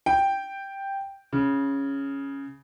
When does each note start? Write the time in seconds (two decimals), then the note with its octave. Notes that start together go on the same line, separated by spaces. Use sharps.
0.06 G5
1.32 C#3